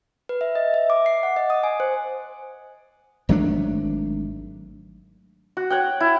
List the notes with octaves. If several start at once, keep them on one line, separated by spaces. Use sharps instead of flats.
B4
E5
D#5
E5
D6
C7
F#5
D#5
D#6
G#5
C5
G#1 F#3 A3 D4
F#4
C#5 F#5 G5
E4